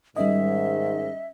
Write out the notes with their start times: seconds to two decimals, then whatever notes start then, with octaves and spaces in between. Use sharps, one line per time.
0.16 G#2 D#3 G3 C#4 D#5 E5